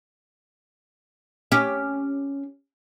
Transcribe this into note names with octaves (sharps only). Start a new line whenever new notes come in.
C#4 G4